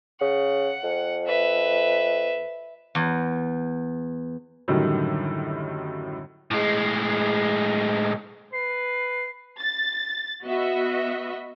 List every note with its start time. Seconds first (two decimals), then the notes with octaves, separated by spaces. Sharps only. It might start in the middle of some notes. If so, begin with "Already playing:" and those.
0.21 C#3 F#5
0.84 F2
1.27 B4 E5
2.95 E2
4.68 F#2 A2 D3 D#3 F#3 G3
6.51 A2 G#3
8.53 B4 C7
9.60 A6
10.46 B3 F#4 D#5 E5